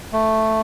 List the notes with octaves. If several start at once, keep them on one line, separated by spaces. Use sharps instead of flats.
A3